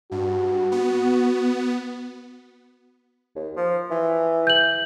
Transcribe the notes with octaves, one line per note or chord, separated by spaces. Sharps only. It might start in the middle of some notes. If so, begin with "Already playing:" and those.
G2 F#4
B3
D#2
F3
E3
G6 F#7